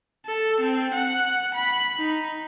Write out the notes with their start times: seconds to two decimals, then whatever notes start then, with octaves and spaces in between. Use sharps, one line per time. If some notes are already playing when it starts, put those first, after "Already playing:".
0.26 A4
0.61 C4
0.94 F#5
1.54 B5
1.99 D#4